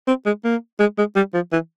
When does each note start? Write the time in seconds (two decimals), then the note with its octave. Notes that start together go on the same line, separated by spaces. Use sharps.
0.08 C4
0.26 G#3
0.45 A#3
0.80 G#3
0.98 G#3
1.16 G3
1.34 F3
1.52 E3